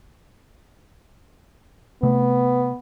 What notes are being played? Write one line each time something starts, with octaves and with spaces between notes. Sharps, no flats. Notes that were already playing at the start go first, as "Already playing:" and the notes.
C3 A3 B3